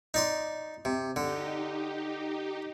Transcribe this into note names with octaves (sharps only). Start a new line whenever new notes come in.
D#4 D5 C6
C3
D3 D#4 G4